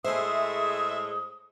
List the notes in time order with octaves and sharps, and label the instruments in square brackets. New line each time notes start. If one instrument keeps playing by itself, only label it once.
[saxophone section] A2 G#3 [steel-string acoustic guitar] G#4 C5 [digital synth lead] E5 [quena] D#6